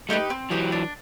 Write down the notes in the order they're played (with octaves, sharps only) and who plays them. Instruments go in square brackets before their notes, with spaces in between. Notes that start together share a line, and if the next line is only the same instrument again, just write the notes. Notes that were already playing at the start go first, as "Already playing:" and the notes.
[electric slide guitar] G3 A3 [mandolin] D#4 G4 B4
[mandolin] C4
[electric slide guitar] E3 F#3 [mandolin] D#4 G4 B4
[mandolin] D4